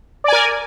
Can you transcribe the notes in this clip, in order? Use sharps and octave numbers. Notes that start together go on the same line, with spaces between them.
A#4 D5 G#5